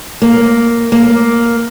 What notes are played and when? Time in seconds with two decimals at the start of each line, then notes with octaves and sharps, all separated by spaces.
0.22 A#3
0.92 A#3